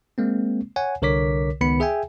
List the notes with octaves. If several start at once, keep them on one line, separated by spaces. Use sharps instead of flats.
G#3 A#3 C4
C#5 F#5 G#5
C2 D3 A#4 C#5 D6 B6
C#2 D#3 B3 B5 C#7
G#4 E5 G5 G#5